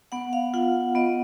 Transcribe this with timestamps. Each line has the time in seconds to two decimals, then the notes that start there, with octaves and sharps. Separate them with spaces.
0.12 B3 F#5
0.33 F5
0.54 F4 F#5
0.95 B3 D#5